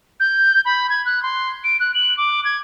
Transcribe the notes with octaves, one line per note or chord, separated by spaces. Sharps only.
G6
B5
G#6
F#6
C6
D7
F#6
F#7
D6
G#6